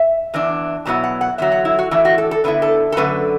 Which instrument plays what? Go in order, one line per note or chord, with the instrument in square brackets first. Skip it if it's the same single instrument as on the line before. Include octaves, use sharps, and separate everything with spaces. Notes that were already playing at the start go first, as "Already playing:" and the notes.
Already playing: [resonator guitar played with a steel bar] E5
E2 E3 D4
B2 F#3 B3 E4 A5
F#5
F#5
E2 D3 F#3 E5
F#5
E4
F#4
A2 E3 D4 E4
F#4
A4
A4
D3 B3 E4 B4
A4
A4
F#2 D3 A3 B4